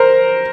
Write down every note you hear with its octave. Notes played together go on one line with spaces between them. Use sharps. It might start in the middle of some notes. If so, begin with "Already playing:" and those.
Already playing: A#4 C5